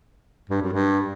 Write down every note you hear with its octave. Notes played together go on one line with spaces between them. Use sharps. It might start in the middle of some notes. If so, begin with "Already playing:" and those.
G2
F#2
G2